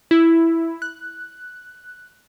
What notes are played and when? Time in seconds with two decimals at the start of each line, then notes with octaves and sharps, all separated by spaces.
0.11 E4
0.82 F#6